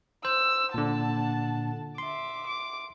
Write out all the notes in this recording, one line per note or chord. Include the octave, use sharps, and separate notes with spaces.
C5 E6
A#2 D3 F#5 A5
E5 C6 D6
D6